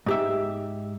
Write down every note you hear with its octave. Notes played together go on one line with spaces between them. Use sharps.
G#2 G4 E5